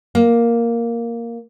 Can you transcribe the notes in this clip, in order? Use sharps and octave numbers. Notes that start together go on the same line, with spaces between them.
A#3